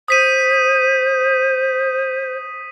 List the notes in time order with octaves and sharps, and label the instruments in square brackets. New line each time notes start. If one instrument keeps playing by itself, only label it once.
[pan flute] C5 [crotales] D#6 B6 D#7